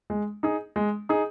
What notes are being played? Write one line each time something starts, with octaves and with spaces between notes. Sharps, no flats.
G#3
D#4 G#4
G#3
D#4 G#4